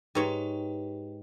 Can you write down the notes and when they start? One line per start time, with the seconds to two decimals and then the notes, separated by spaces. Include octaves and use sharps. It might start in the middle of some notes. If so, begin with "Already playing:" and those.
0.15 G#2 G4 B4 C#5 G5